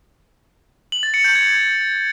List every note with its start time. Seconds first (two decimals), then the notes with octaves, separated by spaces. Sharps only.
0.92 F#7
1.03 A6
1.14 C#7
1.24 G6
1.35 G#6